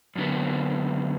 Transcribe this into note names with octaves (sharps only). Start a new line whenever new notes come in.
F#2 D3 F#3 B3